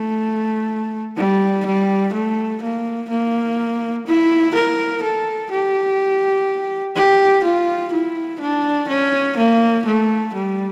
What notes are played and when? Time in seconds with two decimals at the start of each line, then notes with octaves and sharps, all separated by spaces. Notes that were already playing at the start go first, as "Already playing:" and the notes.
Already playing: A3
1.16 G3
1.66 G3
2.13 A3
2.62 A#3
3.09 A#3
4.07 E4
4.55 A#4
5.03 A4
5.51 G4
6.96 G4
7.44 F4
7.92 E4
8.40 D4
8.88 C#4
9.37 A#3
9.86 A3
10.34 G3